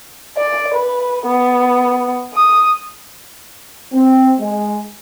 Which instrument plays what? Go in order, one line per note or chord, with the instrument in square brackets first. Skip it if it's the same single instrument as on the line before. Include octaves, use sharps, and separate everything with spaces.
[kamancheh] D5
B4
B3
D#6
[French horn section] C4
G#3